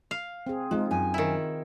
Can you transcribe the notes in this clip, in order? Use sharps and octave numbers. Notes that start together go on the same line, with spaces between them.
F5
C4 G#4
G#3 C4 D#4 F4
F#2 G#5
D#3 E4